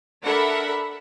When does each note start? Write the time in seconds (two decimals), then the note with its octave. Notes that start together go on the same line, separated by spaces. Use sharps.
0.24 D4 A4 A#4 E5 F#5 B5